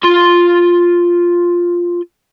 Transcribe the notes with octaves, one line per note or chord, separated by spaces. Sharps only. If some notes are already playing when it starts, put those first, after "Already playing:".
F4 C6